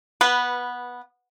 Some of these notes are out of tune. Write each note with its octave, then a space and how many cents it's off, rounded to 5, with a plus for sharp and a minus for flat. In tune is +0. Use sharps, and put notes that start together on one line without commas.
B3 -10 B4 +0